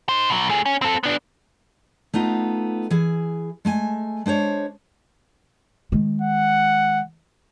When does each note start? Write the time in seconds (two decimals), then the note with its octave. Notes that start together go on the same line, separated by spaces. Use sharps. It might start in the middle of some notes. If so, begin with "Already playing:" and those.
0.09 D#4 C5
0.30 B2 F#3
0.49 A3 G#4
0.66 C#4
0.82 C4 A4
1.04 B3 D4
2.14 A3 B3 D#4 F4
2.90 E3 G#4
3.65 G#3 A3 G#5
4.26 G#3 D4 C5 C#5
5.92 D#3 G#3
6.22 F#5